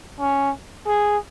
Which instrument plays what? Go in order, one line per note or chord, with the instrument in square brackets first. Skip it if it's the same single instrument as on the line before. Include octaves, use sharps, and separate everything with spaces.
[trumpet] C#4
G#4